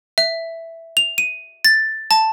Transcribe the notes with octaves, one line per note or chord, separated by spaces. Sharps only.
E5
F7
D#7
A6
A5